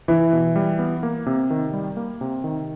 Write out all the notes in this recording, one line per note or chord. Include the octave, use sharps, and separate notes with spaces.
E3 E4
B2
G3
B3
A#3
C3
D#3
G3
A#3
C3
D#3